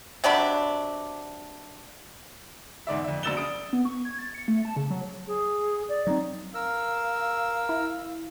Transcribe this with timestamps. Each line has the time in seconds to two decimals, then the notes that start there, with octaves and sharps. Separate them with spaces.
0.24 C3 F#3 D4 B5
2.87 E2 G#2 D5 E5
3.04 F2 E5
3.23 A#1 F#3 E6 A6 E7 G7
3.37 C#3 D#6 D7
3.73 B3
3.85 C#6
4.05 G#6
4.19 A6
4.35 C#7
4.48 A3
4.65 A5
4.76 C#3
4.90 F#3
5.27 G#4
5.89 D5
6.07 F#3 C4 D#4
6.54 A#4 F5 E6
7.69 E4